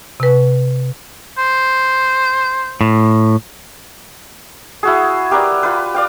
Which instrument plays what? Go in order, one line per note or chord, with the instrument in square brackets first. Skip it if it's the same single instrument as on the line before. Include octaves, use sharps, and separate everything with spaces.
[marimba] C3 B4
[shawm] C5
[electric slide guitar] A2
[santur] E4 F#4 G#4
G4 A#4 B4 D5
F4 B4
D5 F5 G5